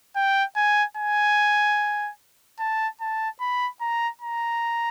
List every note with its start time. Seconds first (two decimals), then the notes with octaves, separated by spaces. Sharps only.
0.16 G5
0.56 G#5
0.97 G#5
2.59 A5
3.01 A5
3.40 B5
3.81 A#5
4.21 A#5